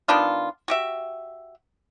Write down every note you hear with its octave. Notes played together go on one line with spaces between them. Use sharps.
D#3 B3 D4 F4
F#4 G4 E5